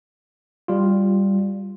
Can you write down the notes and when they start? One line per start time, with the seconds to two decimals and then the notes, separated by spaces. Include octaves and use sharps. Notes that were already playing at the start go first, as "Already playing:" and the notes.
0.68 G3 F4